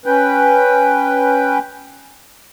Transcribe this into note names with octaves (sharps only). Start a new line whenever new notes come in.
C#4 B4 G5